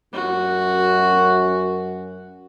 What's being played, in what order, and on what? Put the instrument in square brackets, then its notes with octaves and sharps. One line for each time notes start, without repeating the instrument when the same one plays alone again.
[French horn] F#2 [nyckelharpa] F#4